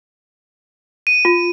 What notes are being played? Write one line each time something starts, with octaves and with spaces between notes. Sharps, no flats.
D#7
F4